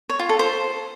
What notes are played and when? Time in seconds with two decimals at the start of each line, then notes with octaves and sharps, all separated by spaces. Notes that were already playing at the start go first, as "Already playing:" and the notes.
0.09 C#5
0.19 F4
0.29 A4
0.39 C5